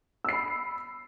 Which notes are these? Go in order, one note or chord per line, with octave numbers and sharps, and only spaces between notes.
B5 E6 C7